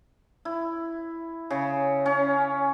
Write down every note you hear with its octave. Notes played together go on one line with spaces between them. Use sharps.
E4
C#3
C#4